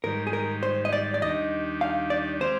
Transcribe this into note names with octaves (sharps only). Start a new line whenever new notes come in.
G#2 D#3 G3 A#4
G#4
A#4
C5
D#5
D5
D5
D#2 D#3 G3 D4 D#5
F5
D5
G#3 C4 G4 C5 D5 F5